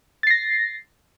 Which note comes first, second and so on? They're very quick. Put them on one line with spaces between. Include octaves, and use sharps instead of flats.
A6 C7 A#6